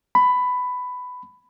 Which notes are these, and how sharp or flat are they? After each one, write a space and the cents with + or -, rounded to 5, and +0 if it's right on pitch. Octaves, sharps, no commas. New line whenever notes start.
B5 +15